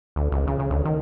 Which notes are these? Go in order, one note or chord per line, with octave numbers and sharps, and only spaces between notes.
D2
C#2
C#3
C#3
D2
D#3